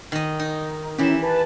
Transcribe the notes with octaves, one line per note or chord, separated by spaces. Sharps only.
D#3 D#5
D#4
E3 C#4 E4 G4 E7
B4 A5